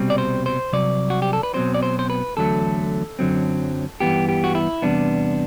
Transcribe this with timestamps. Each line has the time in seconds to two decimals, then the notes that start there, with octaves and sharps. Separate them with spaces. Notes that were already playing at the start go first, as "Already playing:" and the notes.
Already playing: C2 B2 G3 C4
0.10 D5
0.18 C5
0.46 C5
0.73 C2 C3 F#3 D5
1.10 F#4
1.22 G4
1.33 A4
1.43 B4
1.54 B2 F#3 C4 C5
1.74 D5
1.83 C5
1.99 C5
2.10 B4
2.37 E2 D3 F#3 A3 A4
3.19 F#2 D3 F#3 C4
4.00 G2 E3 B3 G4
4.29 G4
4.44 F#4
4.55 E4
4.82 E2 C3 G3 B3 D4